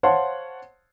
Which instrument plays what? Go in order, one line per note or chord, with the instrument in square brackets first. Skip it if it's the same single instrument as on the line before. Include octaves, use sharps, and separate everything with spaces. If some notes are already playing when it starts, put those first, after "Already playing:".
[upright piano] C5 C#5 F5 F#5 A5 C6